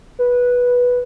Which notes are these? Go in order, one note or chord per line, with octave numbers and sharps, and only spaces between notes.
B4